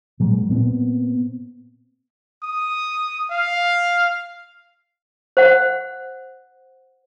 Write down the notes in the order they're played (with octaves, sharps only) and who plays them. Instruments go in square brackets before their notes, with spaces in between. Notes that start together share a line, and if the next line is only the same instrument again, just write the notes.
[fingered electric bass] A#2 F#3 G#3
A#2 B3 C4
[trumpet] D#6
F5
[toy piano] C5 F#5